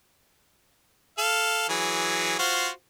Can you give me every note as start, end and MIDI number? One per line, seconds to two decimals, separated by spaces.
1.18 1.65 69
1.18 1.65 77
1.69 2.35 52
1.69 2.35 54
1.69 2.35 68
2.39 2.69 65
2.39 2.69 66
2.39 2.69 72